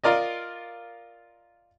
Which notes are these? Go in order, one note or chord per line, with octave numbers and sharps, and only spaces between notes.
F4 A#4 D5 D#5